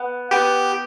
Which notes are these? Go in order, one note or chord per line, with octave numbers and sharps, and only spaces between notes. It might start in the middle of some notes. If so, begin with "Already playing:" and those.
Already playing: B3
B3 G4